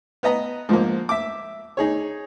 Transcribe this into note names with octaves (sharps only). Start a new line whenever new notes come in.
B3 B4 D#5 A#5
G#2 F3 A#3
E5 D6
D#4 G#4 C#5